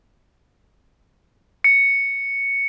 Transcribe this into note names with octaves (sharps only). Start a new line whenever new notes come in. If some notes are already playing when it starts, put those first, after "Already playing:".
C#7